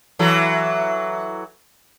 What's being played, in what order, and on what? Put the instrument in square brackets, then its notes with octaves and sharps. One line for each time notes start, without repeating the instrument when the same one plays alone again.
[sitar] E3 F#3 A4